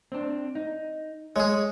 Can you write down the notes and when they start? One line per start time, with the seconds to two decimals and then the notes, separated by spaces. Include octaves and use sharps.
0.12 C4 D4
0.55 D#4
1.36 G#3 G#4 C#5